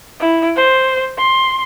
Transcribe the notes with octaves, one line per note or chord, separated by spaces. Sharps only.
E4
C5
C6